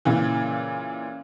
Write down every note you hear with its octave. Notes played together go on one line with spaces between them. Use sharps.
A#2 C#3 E3